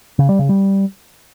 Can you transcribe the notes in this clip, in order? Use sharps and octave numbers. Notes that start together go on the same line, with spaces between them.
C#3
G3
C#3
G3